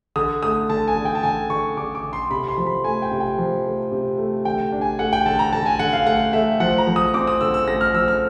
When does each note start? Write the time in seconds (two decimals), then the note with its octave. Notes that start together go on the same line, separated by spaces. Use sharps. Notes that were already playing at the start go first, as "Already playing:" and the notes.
0.16 D3 D#6
0.43 A3 D#6
0.70 D3 A5
0.88 G#5
0.96 D3
1.05 G5
1.15 A5
1.23 D3 G#5
1.50 D3 C#6
1.77 D3 D6
1.95 D6
2.04 D3
2.13 C6
2.30 C3 B5
2.48 C6
2.58 F3
2.66 B5
2.84 A3 G#5
3.02 G5
3.11 C3
3.20 G5
3.38 F3
3.65 A3
3.92 C3
4.18 A3
4.45 D3 G5
4.72 D4
4.81 G#5
4.99 A3 F#5
5.13 G5
5.26 D3 A5
5.39 A#5
5.53 D3 A5
5.66 G#5
5.79 D3 F#5
5.93 F5
6.06 A3 F#5
6.33 A3 E5
6.60 F3 F#5
6.78 A#5
6.87 F3
6.96 D#6
7.14 C4 D6
7.27 D#6
7.41 D3 E6
7.54 E6
7.68 A3 A#6
7.81 F6
7.94 F3 E6
8.08 F6